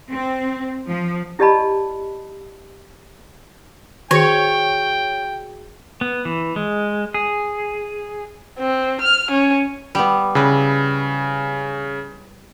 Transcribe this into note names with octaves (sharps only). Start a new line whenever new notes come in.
C4
F3
E4 G4 D5 D#5 A5 B5
D#3 F#4 G#4 C#5 G5 C#7
B3
E3
G#3
G#4
C4
F6
C#4
G3 B3
C#3 E4 B4